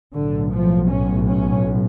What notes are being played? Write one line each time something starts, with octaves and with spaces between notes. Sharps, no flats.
B1 A2 D3
F3
C#4
C#4